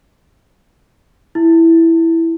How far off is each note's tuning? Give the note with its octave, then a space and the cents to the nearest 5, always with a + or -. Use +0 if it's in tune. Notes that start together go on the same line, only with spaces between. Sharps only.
E4 +0